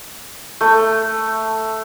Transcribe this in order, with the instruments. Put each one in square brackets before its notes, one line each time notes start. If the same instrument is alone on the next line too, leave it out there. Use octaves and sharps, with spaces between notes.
[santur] A3